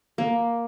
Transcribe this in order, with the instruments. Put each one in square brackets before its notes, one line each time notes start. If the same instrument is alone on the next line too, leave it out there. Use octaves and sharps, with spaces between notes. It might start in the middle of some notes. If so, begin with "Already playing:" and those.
[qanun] A#3